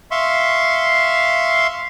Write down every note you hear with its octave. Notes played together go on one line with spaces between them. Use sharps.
E5 F5 C6 C#6